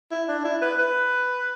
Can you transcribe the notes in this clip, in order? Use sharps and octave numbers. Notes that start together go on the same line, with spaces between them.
E4
D4
E4
B4
B4